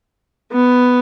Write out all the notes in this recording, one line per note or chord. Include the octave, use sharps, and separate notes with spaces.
B3